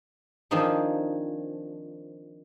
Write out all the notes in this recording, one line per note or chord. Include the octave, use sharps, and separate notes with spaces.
D#3 F3 C4 D4 D#4 G#4